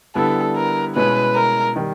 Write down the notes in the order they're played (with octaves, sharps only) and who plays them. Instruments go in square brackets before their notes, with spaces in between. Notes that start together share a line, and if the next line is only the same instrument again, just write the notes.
[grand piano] D3 G3 B3 E4 [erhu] A4
[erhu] A#4
[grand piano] B2 G#3 C#4 E4 [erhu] B4
[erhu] A#4
[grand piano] D#3 G3